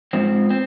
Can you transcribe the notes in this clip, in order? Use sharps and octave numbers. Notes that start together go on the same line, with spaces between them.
G#2 F3 C4
C4